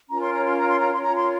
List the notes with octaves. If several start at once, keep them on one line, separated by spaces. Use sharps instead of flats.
C#4 F4 A#4 C#5 A#5
C6
A#5
C6
A#5
C6
A#5
C#4 F4 A#4 C#5 C6
A#5
C6